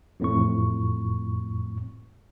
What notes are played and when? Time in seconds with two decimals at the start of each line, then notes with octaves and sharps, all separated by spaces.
0.20 A1 F2 A2 C#6